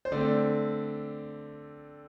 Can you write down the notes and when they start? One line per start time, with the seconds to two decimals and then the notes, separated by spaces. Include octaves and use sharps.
0.05 C5
0.12 D3 A3 C4 D5